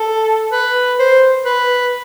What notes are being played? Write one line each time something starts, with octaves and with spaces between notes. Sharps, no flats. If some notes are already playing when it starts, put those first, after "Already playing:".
Already playing: A4
B4
C5
B4